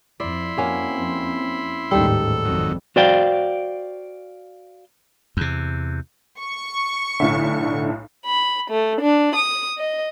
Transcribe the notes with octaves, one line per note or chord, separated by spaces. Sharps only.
F2 E4 D5 B5 C6
F2 A#3 C4 C#4 F#4
A1 D#2 G#2 G3 D#4 A4
G#1 F2 D#3 F#3
F#4 C5 D5 F5 G5
E2 C3
C#6
B1 A2 D3 E5
B5
A3
D4
D#6
D#5